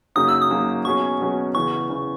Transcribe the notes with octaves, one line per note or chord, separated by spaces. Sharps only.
F#2 C#3 F#3 A#3 D#4 D#6
E6
D#6
F#2 C#3 F#3 A#3 D#4
B2 F#3 C#4 G#4 C#6
B2 F#3 C#4 G#4
E2 C#3 E3 C#6
E2 C#3 E3